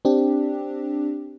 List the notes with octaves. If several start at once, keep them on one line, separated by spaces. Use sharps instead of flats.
C4 D4 G4